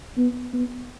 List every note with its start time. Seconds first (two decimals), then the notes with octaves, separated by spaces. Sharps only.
0.17 B3
0.54 B3